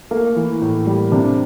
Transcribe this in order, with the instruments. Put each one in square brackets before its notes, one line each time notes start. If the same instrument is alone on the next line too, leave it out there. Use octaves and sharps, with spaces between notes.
[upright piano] A3 [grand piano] A#3
[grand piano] E3
A2
G3
[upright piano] C3 [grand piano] D4